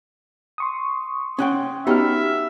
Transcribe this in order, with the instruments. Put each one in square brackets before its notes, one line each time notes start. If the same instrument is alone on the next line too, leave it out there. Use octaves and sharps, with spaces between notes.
[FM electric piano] C6 C#6 D#6
[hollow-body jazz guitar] C#4 F#5 G5
[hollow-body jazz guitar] B3 C#4 D#4 [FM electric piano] F#4 G4 F6 [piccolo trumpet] E5